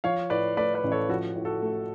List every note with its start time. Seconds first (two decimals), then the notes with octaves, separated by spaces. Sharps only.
0.04 F3 C#5 F5
0.30 A2 B4 D5
0.57 A3 B4 D5
0.74 B4 D5
0.84 A1
0.92 A4 C#5
1.09 F3 F#4 A4
1.36 A2
1.45 F#4 A4
1.62 A3